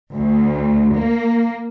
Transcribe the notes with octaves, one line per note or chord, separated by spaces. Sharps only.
D2
A#3